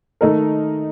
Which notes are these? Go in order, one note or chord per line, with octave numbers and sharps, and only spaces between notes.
D#3 A3 D#4 A#4